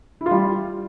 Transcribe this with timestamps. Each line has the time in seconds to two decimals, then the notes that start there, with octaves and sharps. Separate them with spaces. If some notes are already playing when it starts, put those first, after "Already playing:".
0.21 E4
0.26 F4
0.31 G3